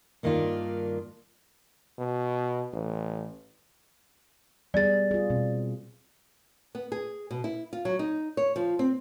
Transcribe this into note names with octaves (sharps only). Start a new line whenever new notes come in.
G2 D#3 A#3 D4 F4
B2
A1
G3 B3 G#4 D5 A6
F4 G#4
B2 C4
B3
G#4
B2
E4
F4
F#3
D#4
C#5
F3
C4